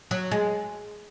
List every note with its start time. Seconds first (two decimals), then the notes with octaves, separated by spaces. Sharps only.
0.11 F#3
0.31 G#3